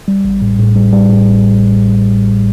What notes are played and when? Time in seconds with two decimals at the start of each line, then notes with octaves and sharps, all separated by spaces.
0.08 G3
0.25 A1
0.41 A2
0.59 A2
0.76 G3
0.93 G3
1.10 A2
1.26 A1